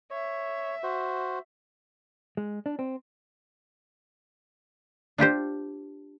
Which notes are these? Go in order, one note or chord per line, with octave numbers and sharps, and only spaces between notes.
C#5 E5
F#4 C5
G#3
D4
C4
D4 F4 G4 C5